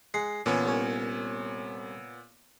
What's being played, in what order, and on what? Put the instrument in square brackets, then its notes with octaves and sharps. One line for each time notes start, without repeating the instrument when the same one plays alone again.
[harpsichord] G#3 F#5 [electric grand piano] C7
[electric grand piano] A#2 B3 C#5 [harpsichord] D3 E3 C#4
[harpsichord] C2 C#4